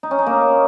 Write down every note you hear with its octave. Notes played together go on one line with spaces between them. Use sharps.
D#4
C#4
D#4
A#3